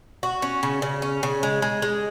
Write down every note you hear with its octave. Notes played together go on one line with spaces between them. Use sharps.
F#4
C#4
C#3
C#3
C#4
C#3
G#3
G#3
G#3